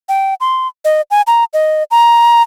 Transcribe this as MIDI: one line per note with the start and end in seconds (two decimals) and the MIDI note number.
0.09 0.34 79
0.41 0.68 84
0.85 1.01 75
1.11 1.22 80
1.27 1.44 82
1.53 1.83 75
1.91 2.42 82